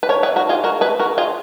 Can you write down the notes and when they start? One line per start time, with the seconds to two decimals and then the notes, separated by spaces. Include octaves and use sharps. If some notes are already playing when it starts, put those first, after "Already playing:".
0.03 B4
0.09 A#4 C#5
0.23 G#4 B4
0.36 F#4 A#4
0.49 F4 G#4
0.64 F#4 A#4
0.81 G#4 B4
1.00 F#4 A#4
1.18 F4 G#4